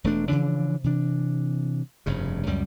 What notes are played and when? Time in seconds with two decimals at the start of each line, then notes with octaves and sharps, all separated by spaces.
0.04 E1 A3 D4
0.29 C#3 E3 F3 D4
0.84 C3 E3 D4
2.06 F1 G2 C#3
2.47 C#2 F#2 G3